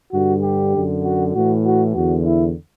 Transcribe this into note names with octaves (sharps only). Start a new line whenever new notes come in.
G2 D3 F#4
G4
F#2 D3
F#4
A2 E3 F#4
F#4
E2 D3 F#4
E4